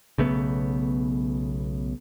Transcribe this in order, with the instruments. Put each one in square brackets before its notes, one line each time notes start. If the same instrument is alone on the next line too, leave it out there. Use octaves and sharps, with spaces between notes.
[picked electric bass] B1 C#3 A3 B3